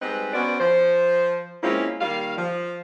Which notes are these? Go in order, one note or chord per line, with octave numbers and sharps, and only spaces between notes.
G3 G#3 C4 D#4 B4
B3 C#4 F#4 C5 D5
F3 C5
G#3 A#3 C4 C#4 E4 F4
D#3 G3 A#3 F5
F3